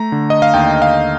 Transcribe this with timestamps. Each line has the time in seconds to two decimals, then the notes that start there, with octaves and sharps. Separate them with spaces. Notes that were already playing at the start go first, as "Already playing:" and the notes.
Already playing: A3 A#5
0.12 D3
0.30 D#5
0.42 F5
0.54 D#2 G5
0.82 F5